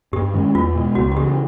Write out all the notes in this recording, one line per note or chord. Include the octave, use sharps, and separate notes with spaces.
G2 G4
D#3 G#3 C#4
E2 F4
B2 G#3
C#2 F#4
F#4
C#3 E3 G4